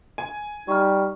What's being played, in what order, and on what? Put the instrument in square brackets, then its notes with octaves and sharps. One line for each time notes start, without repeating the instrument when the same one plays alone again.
[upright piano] G#5
[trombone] G3 [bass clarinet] D#4 [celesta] C#6 F6